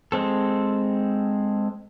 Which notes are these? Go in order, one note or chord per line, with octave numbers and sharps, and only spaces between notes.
G#3 C4 A4